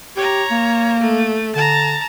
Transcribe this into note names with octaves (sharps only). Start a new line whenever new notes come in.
G4 C#5 A#5
A#3
A3
D3 A5 A#5